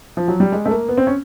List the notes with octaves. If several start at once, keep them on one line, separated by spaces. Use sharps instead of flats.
F3
F#3
G3
G#3
A3
A#3
B3
C4
C#4